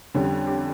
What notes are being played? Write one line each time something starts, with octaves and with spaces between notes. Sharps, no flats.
F2 D3 G3 C#4
G4